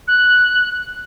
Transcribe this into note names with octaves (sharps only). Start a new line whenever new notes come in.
F#6